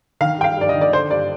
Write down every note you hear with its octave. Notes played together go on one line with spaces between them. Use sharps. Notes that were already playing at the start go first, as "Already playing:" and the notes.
D#3 F5
G2 G5
F5
G2 D5
D#5
D#3
D5
D3 C5
G2 D5